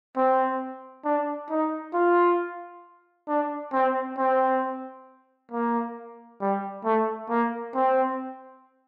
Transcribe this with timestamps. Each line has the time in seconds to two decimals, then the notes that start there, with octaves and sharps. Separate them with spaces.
0.17 C4
1.05 D4
1.50 D#4
1.94 F4
3.28 D4
3.73 C4
4.18 C4
5.52 A#3
6.41 G3
6.84 A3
7.29 A#3
7.75 C4